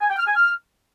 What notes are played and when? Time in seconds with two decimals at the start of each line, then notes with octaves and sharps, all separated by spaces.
0.01 G#5
0.10 G5
0.19 F6
0.27 G#5
0.36 F6